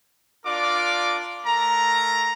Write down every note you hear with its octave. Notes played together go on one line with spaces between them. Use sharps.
D4 F4 A#4 D5 D6
A3 A#4 A#5